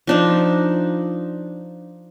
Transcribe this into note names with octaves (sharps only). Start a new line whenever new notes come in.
F3 D4 D#4